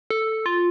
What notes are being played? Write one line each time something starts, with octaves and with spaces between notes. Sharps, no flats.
A4
F4